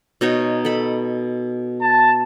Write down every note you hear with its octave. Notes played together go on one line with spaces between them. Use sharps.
B2 D#4 C#5
A4 B5
A5